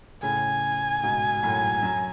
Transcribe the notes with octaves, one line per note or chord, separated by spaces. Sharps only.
A2 C#3 G#5
G#2 B2
F#2 A2
F#2